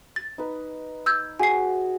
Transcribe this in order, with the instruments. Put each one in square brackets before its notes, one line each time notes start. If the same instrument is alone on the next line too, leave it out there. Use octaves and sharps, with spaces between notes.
[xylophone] A6
[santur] D#4 B4
[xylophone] E6 G6 G#6
[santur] F#4 G#4 [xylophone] G#5 C7